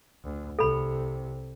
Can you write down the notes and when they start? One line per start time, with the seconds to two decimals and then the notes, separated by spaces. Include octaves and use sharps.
0.24 D2
0.59 C2 C3 A4 B5